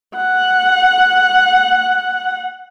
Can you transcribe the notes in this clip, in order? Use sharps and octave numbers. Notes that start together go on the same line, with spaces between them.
F#5